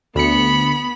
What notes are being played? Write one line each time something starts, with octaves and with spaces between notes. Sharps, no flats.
D2 B3 B5 C#7